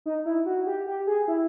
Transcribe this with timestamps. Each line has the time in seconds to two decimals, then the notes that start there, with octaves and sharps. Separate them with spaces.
0.06 D#4
0.26 E4
0.46 F#4
0.67 G4
0.86 G4
1.07 G#4
1.28 E4